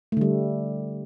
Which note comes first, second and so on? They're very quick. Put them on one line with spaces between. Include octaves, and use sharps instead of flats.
A3 D3 G3